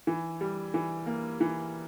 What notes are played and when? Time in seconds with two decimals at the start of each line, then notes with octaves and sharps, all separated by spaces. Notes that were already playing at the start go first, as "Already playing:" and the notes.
0.07 E3
0.41 G3
0.74 E3
1.06 A#3
1.41 E3